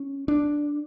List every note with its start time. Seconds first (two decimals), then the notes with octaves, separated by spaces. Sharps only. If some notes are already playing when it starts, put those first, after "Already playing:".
Already playing: C#4
0.28 D4